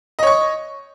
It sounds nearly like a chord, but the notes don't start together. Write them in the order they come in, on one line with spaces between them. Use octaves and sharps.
D#5 C#5 C#6